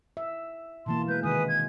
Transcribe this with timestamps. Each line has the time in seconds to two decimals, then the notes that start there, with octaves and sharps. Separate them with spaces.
0.17 E5
0.86 B2 E3 A#3 A5 C6
1.08 G#3 B4 G6
1.23 C3 D#3 G#3 B4 G#5 D#6
1.48 G#6